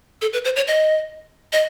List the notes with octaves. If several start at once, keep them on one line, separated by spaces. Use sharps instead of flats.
A4
B4
C5
C#5
D#5
D#5